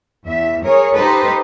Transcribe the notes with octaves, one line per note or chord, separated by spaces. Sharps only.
E2 E5
G#4 A#4 C#5
D#4 G4 A4 B4 C5